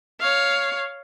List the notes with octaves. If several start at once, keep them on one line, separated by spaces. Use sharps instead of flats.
C#5 F5